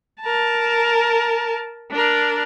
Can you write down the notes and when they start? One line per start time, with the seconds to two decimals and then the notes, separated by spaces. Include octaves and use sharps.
0.21 A#4 A5
1.92 D4 A#4